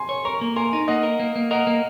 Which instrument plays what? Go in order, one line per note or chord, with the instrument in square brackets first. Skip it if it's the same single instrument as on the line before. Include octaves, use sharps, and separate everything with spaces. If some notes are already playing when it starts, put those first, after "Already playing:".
Already playing: [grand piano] G#5 C6
[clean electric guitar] C#5
[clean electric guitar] A#4 [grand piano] A#5 C#6
[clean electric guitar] A#3
[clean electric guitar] A#4 [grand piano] G#5 C6
[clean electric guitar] D#4
[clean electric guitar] A#3 [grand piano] D#5 F#5
[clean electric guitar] A#4
A#3
A#3
[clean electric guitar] A#4 [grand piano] D#5 F#5
[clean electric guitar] A#3